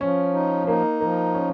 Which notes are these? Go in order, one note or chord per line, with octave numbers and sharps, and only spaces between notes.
F3 C#4
D#4
A#3 D#4
F3 A#3
C#4